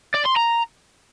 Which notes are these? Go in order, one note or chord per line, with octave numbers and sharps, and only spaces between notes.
D5
C6
A#5